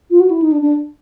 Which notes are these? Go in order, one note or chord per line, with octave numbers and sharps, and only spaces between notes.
F4
F#4
E4
D#4
D4
D4